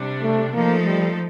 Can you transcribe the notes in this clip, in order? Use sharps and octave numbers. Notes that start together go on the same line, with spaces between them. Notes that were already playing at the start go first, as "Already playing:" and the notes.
Already playing: C3 G3 D4
A3
F3 A3 A#3 D#4 A4
G3